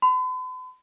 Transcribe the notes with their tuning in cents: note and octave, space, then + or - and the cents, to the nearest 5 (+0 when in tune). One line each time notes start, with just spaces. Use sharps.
B5 +45